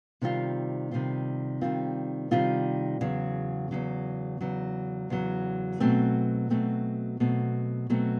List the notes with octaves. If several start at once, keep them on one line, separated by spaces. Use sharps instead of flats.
C3 D#3 G3 C4 F4
C3 D#3 G3 C4 F4
C3 D#3 G3 C4 F4
C3 D#3 G3 C4 F4
E2 C#3 F#3
E2 C#3 F#3
E2 C#3 F#3
E2 C#3 F#3
B2 F#3 A3 C4
B2 F#3 A3 C4
B2 F#3 A3 C4
B2 F#3 A3 C4